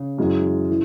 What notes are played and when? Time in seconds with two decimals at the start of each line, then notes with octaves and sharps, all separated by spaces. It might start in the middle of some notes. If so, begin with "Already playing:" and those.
Already playing: C#3
0.18 F#2 E3 G#3
0.70 E3